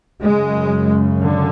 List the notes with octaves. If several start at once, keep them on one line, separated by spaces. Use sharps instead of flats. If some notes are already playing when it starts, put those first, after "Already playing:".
F#2 C#3 G#3
D3